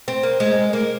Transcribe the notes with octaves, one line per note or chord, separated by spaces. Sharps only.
C4
A#3
G#3
A#3